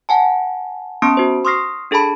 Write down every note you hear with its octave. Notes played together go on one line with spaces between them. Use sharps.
F#5 G#5 A5
B3 C#4 A5 C6 D#6 D7
F#4 C5
C6 C#6 D#6 F6 A#6 C7
D4 G#4 A4 A5 B5